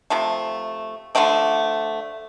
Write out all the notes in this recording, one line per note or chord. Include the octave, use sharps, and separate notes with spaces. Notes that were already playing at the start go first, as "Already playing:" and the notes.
C3 F3 A3
D3 F3 A3 D5